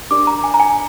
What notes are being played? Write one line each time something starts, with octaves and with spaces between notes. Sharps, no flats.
D4 G4 A#4 D5 D6
A#5
G#5
A#5
G#5